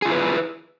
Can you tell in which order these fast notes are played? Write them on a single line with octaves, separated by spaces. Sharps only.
G#4 F4 E4 B4